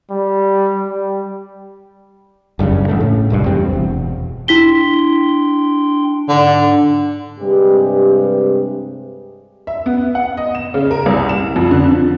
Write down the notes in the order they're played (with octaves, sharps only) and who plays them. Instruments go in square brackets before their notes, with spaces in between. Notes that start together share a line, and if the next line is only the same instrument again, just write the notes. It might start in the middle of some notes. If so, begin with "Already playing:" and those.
[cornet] G3
G3
[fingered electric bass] F#1 G2 A#2 C#3
A1 A2 A3
A2 C#3
F1 C2 G2
E2 G2 G3 C4
E1
[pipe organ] D4 G5 C6 [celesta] E4 B6 G7
[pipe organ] G#2 D4 [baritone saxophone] D3
[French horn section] G2 C3 G#3 G4 B4
[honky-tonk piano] E5
B3
F#5
D#5
E7
C#3
A#4
C2
E7
F2
D3
F3